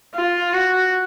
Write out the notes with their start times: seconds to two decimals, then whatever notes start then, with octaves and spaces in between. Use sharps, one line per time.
0.15 F4
0.53 F#4